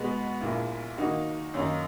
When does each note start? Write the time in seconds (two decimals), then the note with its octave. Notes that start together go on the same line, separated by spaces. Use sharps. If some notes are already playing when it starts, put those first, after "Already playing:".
Already playing: B2 G#3 B3
0.41 A#1 A#2 A#3 E4
0.98 D#3 A#3 D#4 F#4
1.54 F#2 D#3 A#3 D#4